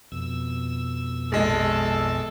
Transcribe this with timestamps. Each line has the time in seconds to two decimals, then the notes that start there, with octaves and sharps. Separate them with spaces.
0.12 F2 B2 E6
1.32 A#1 G#3 A4